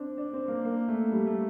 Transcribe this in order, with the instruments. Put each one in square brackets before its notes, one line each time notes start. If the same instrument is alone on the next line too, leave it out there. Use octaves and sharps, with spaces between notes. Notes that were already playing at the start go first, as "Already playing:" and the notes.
Already playing: [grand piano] C4 D4
D4
C4
A#3
A#3
A3
G3
A3